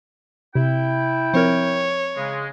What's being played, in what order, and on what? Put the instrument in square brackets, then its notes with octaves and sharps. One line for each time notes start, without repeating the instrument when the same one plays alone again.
[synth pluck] C3 [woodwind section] E4 G5
[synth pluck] F3 C4 A#4 [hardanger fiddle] C#5
[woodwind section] C#3 G#3